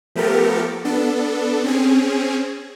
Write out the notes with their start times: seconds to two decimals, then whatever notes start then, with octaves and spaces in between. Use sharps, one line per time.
0.15 F3 A3 B3 G4 A4 A#4
0.85 B3 D4 A4
1.64 C4 C#4 G#4